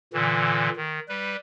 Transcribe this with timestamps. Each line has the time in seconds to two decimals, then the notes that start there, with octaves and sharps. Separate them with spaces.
0.13 A#2 D3 E3
0.76 D#3
1.09 G3 B4